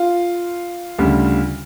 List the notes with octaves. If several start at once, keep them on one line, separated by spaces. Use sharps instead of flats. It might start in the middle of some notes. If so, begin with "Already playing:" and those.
Already playing: F4
D2 C#3 G3